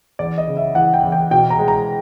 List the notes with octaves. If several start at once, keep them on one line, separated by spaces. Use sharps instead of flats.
E2 D5
D#5
C#3
E5
E3 F#5
G5
E2
G5
B2 G5
A#5
G#3
A#5